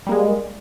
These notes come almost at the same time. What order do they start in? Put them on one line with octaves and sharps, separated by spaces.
G3 A#3 G#3